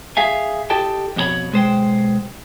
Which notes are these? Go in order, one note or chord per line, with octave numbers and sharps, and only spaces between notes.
G#4 E5 F5 G#5
E4 G4 A4 D#5 G5 A5
F2 B2 G4 C#5 B5
B1 G#3 C5 G5